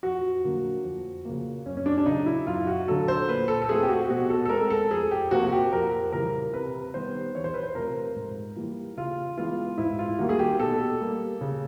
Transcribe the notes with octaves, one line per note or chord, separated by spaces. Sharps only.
F2 F#4
D3 F#3 A#3
F2
C#3 F3 A#3
F#2 C#4
C#4
D4
D4
C#3 F#3 D#4
E4
F#2 F4
F#4
D3 F#3 A4
C5
A#2 B4
A4
A4
F3 A3 C4 G#4
G4
F#4
B2 F#4
A4
A4
G#3 C4 A#4
A4
F2 G#4
G4
C3 F3 A#3 F#4
F#4
G4
F2 A#4
C#3 E3 G3 A#4
C3 B4
D#3 G3 B3 C5
E2 C#5
C5
B4
C5
C3 F3 A3 A#4
G#2
E3 G3 A#3
C#3 F4
E3 G#3 B3 F4
G#2 E4
F4
D#3 G3 A#3 F#4
G#4
G4
B2 A4
G3 A#3
C#3